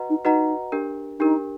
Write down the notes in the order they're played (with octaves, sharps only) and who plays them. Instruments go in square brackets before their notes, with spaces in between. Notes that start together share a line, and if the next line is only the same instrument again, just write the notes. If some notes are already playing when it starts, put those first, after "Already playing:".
Already playing: [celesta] F#4 B4 D#5 F#5 A#5
[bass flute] D#4
[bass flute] D#4 [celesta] F#4 B4 D#5 F#5 A#5
[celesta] D4 G4 A#4
[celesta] D4 G4 A#4 [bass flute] D#4